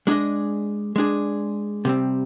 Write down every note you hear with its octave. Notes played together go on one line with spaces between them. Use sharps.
G#3 D4 G#4 D#5
G#3 D4 G#4
C3 G3 C4